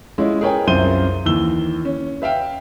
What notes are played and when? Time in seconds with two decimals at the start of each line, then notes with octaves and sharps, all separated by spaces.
0.18 G#3 C#4 E4 F4
0.41 G#4 A#4 B4 C#5 G5 G#5
0.67 C2 F#2 F4 C5 D#7 G7
1.25 D#2 E3 E6 G7
1.85 C#4
2.22 B4 E5 F5 G5